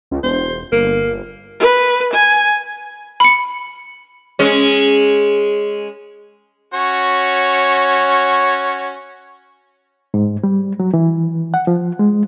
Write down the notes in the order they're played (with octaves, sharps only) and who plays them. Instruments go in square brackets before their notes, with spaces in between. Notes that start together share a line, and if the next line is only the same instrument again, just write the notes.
[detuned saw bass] C#2
[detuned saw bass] E1 [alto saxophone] C5
[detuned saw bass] G1 [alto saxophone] A#3
[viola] B4
G#5
[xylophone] B5 C#7
[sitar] G#3 C#4
[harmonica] C#4 F#4 C#5
[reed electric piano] G#2
G3
F#3
E3
F#5
F3
G#3